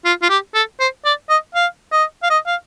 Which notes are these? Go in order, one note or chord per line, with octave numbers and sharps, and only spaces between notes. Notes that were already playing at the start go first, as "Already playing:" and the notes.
F4
F4
G4
A4
C5
D5
D#5
F5
D#5
F5
D#5
F5